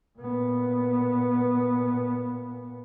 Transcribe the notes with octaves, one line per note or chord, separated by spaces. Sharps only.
A#2 B3